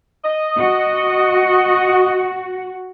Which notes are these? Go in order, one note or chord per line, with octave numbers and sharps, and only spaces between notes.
D#5
F#4